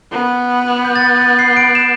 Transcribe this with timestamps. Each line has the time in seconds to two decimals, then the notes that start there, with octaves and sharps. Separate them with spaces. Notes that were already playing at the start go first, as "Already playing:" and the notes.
0.12 B3
0.85 G6
0.96 A6
1.02 G6
1.21 A6
1.39 C7
1.57 D7
1.75 E7